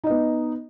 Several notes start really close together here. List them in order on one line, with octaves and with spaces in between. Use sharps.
D#4 D#5 B3